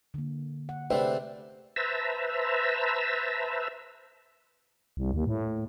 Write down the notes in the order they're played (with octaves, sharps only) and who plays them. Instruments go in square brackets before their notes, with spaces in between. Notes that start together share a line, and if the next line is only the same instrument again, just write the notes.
[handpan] D3 A#3
F#5
[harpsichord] C3 A3 D4 [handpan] G#4 B4 [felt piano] C5 E5 G5
[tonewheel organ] B4 C5 E5 A5 A#5 E6
[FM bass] C2
D#2
A2